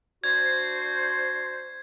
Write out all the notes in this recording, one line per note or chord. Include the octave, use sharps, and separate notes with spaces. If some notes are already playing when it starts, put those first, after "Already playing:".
D4 F#4 C5 G#6